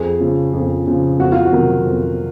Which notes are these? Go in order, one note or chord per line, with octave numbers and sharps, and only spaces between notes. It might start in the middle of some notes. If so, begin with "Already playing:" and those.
Already playing: F2 G#4
C#3 F3
F2
C#3 F3
F2 F#4
F4
F#4
C3 D#3 F#3
F2